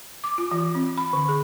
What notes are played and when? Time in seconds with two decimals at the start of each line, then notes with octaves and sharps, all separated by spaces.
0.24 D6
0.38 F4
0.51 E3
0.75 C4
0.98 B5
1.13 D3
1.29 G#4